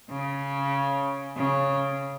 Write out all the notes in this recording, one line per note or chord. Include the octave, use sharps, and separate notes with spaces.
C#3
C#3